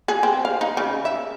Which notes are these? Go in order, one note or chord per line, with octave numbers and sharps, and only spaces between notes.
G#4
C4
F5
D#4
C#3
E5